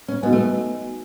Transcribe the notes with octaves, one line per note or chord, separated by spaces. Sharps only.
C#4
B3 D#4 F#4 B4 D#5 G#5
A3